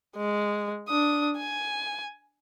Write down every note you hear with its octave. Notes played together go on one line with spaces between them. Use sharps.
G#3
D4 D#6
G#5